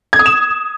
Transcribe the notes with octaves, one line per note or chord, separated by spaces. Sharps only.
G#6
D#6
E7